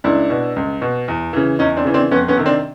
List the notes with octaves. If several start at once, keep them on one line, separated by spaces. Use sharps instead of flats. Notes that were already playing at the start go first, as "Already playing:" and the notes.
C#2 D4 E4
B2
C#2
B2
E2
C#3 E3
E2 C#4 D#4
C4 D4
C#3 E3
C4 D4
F2 B3 C#4
B3 C#4
C3 D#3
C4 D4